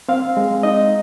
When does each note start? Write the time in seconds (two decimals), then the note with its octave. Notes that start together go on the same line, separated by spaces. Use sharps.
0.08 C4 F5
0.37 G#3
0.63 D#4 D#5